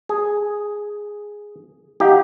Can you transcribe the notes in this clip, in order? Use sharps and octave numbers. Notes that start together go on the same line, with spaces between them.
G#4
D#4 E4 G4 F5 F#5